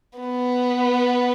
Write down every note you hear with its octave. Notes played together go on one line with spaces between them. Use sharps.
B3